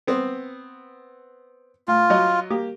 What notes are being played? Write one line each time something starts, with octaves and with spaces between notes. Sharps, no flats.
B3 C4
A2 F4
F#3 D#5
A#3 G4